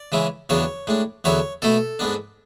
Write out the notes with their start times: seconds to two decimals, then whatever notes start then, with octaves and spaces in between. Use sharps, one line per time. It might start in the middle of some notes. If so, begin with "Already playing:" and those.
Already playing: D5
0.12 C#3 E3 G#3 C#4 E4
0.49 E2 C#3 F#3 B3 D4 C#5
0.87 A2 G#3 D4
1.24 E2 D3 F#3 B3 E4 C#5
1.62 B2 A3 E4 A4
1.99 G#2 G#3 B3 D4